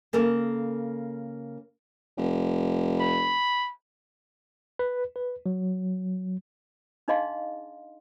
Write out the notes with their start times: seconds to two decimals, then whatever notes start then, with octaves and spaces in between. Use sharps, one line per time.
0.13 C#3 A#3 A4 A#4
2.18 F1
3.00 B5
4.79 B4
5.16 B4
5.46 F#3
7.08 D4 D#4 G#4 D#5 F5 C6